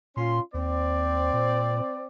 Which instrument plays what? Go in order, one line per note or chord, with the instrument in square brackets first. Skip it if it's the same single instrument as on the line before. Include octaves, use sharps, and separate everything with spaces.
[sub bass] A#2 [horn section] C#4 F4 C6
[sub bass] D#2 [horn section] C4 D5
[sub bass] A#2